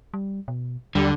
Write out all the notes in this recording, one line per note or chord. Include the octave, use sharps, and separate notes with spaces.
G3
B2
D#2 D3 G3